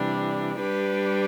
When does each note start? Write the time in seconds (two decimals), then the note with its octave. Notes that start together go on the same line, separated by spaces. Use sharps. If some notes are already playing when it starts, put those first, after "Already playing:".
Already playing: C3 E3 G3 D4
0.59 G3 D4 G4 B4